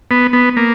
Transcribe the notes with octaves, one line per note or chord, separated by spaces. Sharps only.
B3
B3
A#3